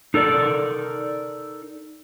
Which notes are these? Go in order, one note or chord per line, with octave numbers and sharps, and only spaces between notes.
D#4 A4 A#4 D5